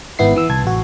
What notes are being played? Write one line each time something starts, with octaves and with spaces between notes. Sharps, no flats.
G#1 G#2 B3 E4 C7
E3 E6
C2 A5 G#6
A1 F#4